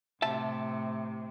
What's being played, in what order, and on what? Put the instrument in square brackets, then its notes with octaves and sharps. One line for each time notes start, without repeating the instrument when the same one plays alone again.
[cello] A2 C3 [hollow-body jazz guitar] E5 A5